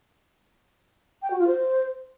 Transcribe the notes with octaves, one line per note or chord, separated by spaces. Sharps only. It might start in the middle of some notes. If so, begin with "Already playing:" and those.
G5
F#4
F4
C5